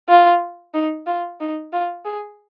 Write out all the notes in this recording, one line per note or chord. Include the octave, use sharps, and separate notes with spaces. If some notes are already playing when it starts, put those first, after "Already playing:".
F4
D#4
F4
D#4
F4
G#4